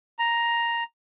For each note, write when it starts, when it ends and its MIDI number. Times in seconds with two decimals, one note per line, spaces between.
0.19 0.84 82